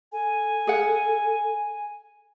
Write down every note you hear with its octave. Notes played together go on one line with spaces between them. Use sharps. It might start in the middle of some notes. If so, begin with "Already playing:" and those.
A4 G#5
G#4 F5 F#5